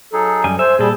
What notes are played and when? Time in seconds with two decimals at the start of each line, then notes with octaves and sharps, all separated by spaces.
0.13 F#3 D#4 G#4 A4
0.44 F#2 G3 G#5
0.59 C5 E5 G#5 E6
0.79 A#2 G3 G#4 A4